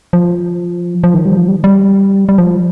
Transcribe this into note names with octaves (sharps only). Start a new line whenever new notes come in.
F3
F3
D#3
G3
F3
G3
G3
G3
F3